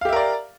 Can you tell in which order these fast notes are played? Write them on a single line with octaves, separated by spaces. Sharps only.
F5 G4 E5 A#4 D5